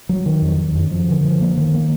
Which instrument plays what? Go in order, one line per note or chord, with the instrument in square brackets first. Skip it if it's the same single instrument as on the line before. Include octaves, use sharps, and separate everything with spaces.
[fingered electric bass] F#3
D#3
F2
D#3
F#2
F3
D3
F3
A#3
D#3
A#3